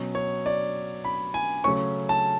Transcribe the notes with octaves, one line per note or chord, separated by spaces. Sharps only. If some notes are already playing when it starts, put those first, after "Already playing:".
Already playing: B2 F#3 C#4
C#5
D5
B5
G#5
C#3 F#3 A3 C#4 C#6
A5